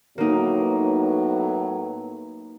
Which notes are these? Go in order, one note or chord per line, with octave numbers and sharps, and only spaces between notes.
A2 F#3 A#3 B3 D#4